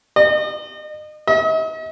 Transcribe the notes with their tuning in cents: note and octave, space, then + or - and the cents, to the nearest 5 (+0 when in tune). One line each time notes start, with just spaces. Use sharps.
D#5 -35
D#5 +45